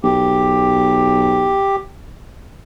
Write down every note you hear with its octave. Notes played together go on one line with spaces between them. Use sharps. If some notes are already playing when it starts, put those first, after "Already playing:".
B1 G4